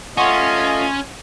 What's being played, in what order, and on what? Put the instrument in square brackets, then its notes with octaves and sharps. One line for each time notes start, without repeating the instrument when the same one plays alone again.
[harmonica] A3 F4 D#5 [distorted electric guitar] C#4 [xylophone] F#5 C#6 [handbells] G#5 C6